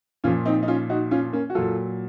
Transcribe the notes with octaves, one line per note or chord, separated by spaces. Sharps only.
A#2 F3 C#4 F4
C4 D#4
D#4
C#4 F4
D#4 F#4
C#4 F4
A#3 C#4
F#4
A#2 F#3 F4 A4